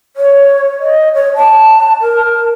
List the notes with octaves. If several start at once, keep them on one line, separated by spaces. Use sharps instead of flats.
C#5
D#5
C#5
A5
A#4